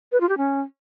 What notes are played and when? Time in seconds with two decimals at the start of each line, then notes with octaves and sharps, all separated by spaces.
0.12 B4
0.20 F4
0.29 G4
0.37 C#4